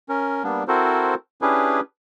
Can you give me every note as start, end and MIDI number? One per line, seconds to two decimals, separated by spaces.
0.09 0.43 61
0.09 0.43 70
0.44 0.63 55
0.44 0.63 58
0.44 0.63 59
0.44 0.63 62
0.68 1.14 60
0.68 1.14 64
0.68 1.14 66
0.68 1.14 69
0.68 1.14 70
0.68 1.14 72
1.42 1.80 61
1.42 1.80 62
1.42 1.80 64
1.42 1.80 67
1.42 1.80 68
1.42 1.80 71